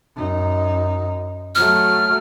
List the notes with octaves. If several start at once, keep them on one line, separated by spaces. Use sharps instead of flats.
F#2 D#4
F#3 A3 F6